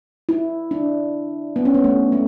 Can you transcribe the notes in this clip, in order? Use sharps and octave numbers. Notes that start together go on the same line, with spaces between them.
E4
D4
B3
C#4
B3
A3
A3